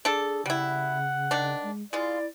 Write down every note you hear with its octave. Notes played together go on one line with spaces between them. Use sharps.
D4 G#4 A4
C#3 G3 E4 F#5
D#3 D4
G#3
G#3 E4 F4 D5